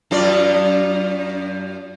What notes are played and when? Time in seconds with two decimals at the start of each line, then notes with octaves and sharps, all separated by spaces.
0.11 F#2 F4 D5